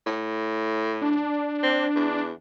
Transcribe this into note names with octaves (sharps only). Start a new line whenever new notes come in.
A2
D4
C4
E2